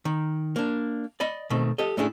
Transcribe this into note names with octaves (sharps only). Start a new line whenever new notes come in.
D#3
A#3 D4
D5 D#5 B5
B2 D#3 A3 C4
G4 A4 D#5
A2 A3 C#4 D4 E4 G#4